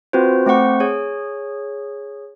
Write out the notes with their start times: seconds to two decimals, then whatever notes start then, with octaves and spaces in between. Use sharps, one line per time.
0.13 C4 F4 F#4 B4 C5
0.46 A3 C4 C5 F#5 C#6
0.80 G#4 C#5